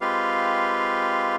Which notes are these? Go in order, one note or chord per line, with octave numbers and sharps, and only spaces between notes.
G#3 C4 F4 G4 B4 F5